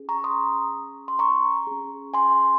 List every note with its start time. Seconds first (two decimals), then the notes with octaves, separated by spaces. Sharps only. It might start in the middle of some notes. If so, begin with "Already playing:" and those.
Already playing: C#4 G#4
0.09 A#5 C#6
0.24 C6 D#6
1.08 C6
1.19 A#5 C#6
1.67 C#4 G#4
2.14 G#5 C6